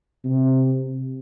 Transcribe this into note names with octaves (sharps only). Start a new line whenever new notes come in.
C3